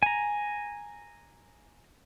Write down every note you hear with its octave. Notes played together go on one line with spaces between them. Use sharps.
G#5 A#5